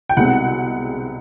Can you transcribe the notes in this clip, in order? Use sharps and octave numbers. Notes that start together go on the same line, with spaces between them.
G5
C2 B2 G#3 C4 F#5